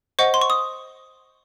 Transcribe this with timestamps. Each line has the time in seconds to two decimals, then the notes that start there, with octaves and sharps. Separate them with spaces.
0.19 C5 D#5 F#5 C#6
0.34 C6
0.41 C#6
0.50 D#6